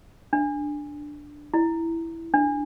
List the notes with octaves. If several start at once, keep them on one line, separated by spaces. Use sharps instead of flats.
D4
E4
D4